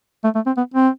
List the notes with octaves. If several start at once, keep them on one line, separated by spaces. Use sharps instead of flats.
A3
A3
C4
B3
C4